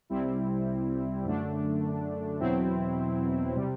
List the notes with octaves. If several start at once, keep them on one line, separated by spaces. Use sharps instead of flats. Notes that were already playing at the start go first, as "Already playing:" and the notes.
C2 C3 G3 C4 E4
F#2 D3 A3 D4
E2 B2 F#3 C4 E4
C3 G3